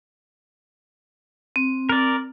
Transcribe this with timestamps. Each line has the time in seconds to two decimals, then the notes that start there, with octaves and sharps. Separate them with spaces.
1.56 C4
1.89 A#4 D5